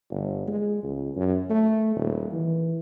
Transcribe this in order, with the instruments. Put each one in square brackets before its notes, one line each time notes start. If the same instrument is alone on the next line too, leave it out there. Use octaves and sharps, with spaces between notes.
[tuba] G1
G#3
C#2
F#2
A3
D#1
E3